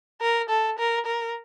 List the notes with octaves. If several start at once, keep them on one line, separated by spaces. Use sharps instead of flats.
A#4
A4
A#4
A#4